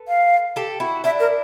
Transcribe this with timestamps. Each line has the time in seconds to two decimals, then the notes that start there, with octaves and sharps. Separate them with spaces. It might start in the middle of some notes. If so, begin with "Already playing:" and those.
Already playing: A4 B4
0.08 F5
0.56 G4 A4
0.80 E4 F#4
1.04 D4 E4 E5
1.20 A#4